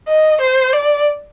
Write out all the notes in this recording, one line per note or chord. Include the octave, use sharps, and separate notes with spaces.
D#5
C5
D5